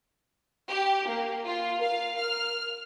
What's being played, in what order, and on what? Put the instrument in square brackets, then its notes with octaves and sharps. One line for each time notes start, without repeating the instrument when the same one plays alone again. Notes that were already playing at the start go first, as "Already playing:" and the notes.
[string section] G4
A#3
F4
[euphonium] A#4 [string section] F5
[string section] F6